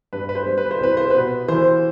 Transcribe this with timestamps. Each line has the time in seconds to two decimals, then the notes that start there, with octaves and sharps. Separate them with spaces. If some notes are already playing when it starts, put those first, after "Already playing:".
0.13 G2 B4
0.29 B4
0.35 C5
0.46 G3
0.58 B4
0.71 C5
0.80 C2 B4
0.97 C5
1.10 B2 B4
1.48 E3 C5